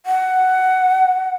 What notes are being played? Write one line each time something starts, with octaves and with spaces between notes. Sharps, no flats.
F#5